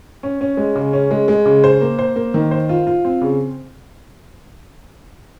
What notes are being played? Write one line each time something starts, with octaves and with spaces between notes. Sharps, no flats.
C#4
C#4
G#3
C#3
C#4
G#3
G#3
C#3
C5
A#3
C5
A#3
D#3
C5
F4
F4
C4
C#3